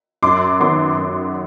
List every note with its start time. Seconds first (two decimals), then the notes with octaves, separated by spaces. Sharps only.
0.23 F#2 C6 D6
0.60 D#3 F#3 B3 C6 D6
0.98 F#2